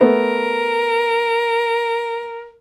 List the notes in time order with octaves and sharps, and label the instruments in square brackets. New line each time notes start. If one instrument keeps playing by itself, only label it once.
[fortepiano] A3 B3 [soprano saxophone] A#4